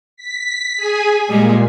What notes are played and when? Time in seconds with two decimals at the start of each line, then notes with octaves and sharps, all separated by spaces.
0.17 B6
0.77 G#4 G#5
1.29 A#2 G3 G#3